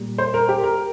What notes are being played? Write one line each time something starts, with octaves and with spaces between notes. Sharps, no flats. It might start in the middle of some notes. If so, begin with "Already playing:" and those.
Already playing: A#2 G3
C5
A#4
G4
A#4